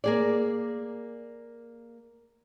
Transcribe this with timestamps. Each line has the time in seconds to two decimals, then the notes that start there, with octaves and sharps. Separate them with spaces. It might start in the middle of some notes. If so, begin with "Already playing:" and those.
0.04 A#3 G#4 D5